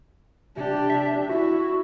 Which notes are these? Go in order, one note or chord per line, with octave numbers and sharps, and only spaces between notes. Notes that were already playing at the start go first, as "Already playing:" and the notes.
C3 D4 G4
E5
E4 F#4